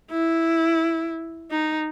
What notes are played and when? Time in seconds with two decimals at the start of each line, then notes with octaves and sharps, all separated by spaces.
0.11 E4
1.51 D#4